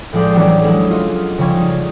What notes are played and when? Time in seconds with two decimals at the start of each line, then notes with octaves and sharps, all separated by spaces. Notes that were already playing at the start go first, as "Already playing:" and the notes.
0.13 A2 F3 G#3 D5 G6 C7
0.34 E3 F#3 C#4 D4 F#4 G4
0.62 F#3 G#3 E4
0.90 F4 F#4 D#5
1.38 C#3 F3 G3 C#6 G#6
1.55 D#4